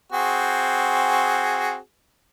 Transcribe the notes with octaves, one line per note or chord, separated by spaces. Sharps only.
C4 F#4 G#4